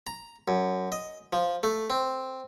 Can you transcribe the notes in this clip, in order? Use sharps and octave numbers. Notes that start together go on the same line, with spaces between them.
A#5
F#2
D#5
F3
A3
C4